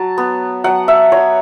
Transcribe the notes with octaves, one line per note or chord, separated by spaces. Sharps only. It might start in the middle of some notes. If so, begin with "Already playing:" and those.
Already playing: F#3 A5
B3
F#3 F#5
E5
F#3 C#5